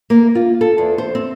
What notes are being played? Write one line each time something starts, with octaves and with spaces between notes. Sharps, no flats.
A#3
F4
A4
E2
C5
C4